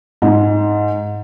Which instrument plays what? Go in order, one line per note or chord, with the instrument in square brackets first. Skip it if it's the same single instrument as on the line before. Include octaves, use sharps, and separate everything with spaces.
[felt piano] G#2